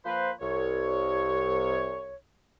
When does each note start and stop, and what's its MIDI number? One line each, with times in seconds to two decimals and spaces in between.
0.05 0.31 53
0.05 0.31 58
0.05 0.31 71
0.05 0.31 72
0.41 2.15 36
0.41 2.15 73